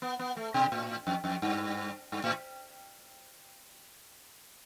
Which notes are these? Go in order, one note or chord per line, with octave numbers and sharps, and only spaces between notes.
B3
B3
A3
B2
A2
F2
F2
G2
G2
A2